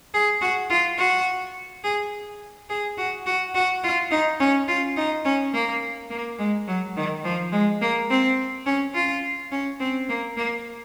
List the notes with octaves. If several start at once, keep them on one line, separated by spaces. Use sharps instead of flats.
G#4
F#4
F4
F#4
G#4
G#4
F#4
F#4
F#4
F4
D#4
C#4
F4
D#4
C#4
A#3
A#3
G#3
F#3
D#3
F3
G#3
A#3
C4
C#4
F4
C#4
C4
A#3
A#3